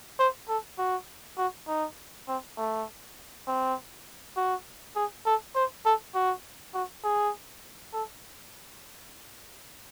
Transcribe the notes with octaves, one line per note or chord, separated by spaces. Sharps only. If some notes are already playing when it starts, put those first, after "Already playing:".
C5
A4
F#4
F#4
D#4
C4
A3
C4
F#4
G#4
A4
C5
A4
F#4
F#4
G#4
A4